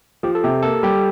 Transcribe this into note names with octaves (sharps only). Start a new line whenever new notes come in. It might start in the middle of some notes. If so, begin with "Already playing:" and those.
F3 G4
A4
C3 G4
A#3 A4
G3 G4